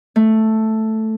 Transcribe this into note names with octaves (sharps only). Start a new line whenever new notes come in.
A3